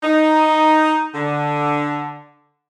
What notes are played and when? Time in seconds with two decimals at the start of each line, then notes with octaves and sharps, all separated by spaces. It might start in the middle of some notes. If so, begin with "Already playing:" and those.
0.02 D#4
1.15 D3